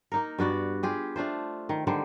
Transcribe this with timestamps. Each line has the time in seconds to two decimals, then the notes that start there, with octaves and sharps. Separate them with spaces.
0.12 A#3 D#4 A#4
0.39 G2 B3 F#4 D5
0.83 F4 G4 G#4
1.16 A3 D4 F4 C5
1.69 D#3
1.87 D3 D#3 G3 C5